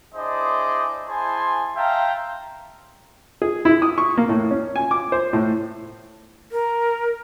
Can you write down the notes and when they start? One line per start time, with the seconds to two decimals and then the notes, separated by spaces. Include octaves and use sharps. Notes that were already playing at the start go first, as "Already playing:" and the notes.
0.15 D4 E4 G#4 C5 D5 D#5
1.08 E4 G#4 C5 G#5 A5 C6
1.76 E5 F5 G5 A5 A#5 C6
3.42 G#4
3.65 E4
3.82 D#6
3.98 C#6
4.18 A#3
4.29 A2
4.51 C#4
4.76 G#5
4.91 D6
5.12 C5
5.33 A2
6.52 A#4